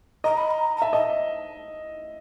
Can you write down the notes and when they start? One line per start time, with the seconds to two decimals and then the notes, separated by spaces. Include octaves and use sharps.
0.24 D#5 A#5
0.37 B5
0.51 A#5
0.77 A#5
0.82 E5 A5
0.93 D#5 A5